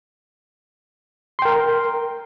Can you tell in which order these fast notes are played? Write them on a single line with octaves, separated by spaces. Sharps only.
C6 G5 A#4